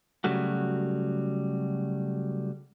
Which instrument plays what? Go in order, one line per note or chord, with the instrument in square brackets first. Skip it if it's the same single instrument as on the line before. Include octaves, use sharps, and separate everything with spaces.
[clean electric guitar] C#3 F#3 G3 A3 F#4